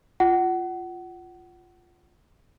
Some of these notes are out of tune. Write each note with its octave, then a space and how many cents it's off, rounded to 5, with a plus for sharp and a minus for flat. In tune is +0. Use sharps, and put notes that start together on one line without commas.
F4 +0 F#5 +25